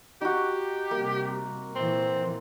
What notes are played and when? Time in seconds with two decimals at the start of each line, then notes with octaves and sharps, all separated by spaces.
0.21 D#4 F#4 G4
0.91 C3 G3 A#3
1.75 A#2 E3 C4